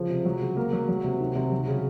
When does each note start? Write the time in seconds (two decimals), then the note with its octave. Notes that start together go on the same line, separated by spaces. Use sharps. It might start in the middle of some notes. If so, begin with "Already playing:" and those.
Already playing: C#3 F3
0.10 C3
0.25 F#3
0.41 C#3
0.57 A#3
0.73 F#3
0.89 F#3
1.04 C3
1.20 D#3
1.36 C3
1.52 F#3
1.67 C#3